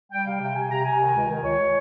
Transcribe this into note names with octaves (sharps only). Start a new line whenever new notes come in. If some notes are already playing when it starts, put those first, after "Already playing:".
G3 G5
C3 F5
C3 G5
C3 G#5
C3 A#5
C3 G#5
D#3
C#2
D#3
C#2 C#5